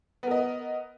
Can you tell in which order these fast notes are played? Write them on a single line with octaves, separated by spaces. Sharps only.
B3 A#4 D#5